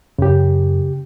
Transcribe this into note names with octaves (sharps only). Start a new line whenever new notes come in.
F#2 C#3 G4